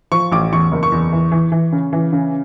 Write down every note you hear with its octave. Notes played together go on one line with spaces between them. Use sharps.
F3 C#6
A1 D6
E2 C#6
F#1
C#6
E2
E3
E3
E3
C#3
E3
C#3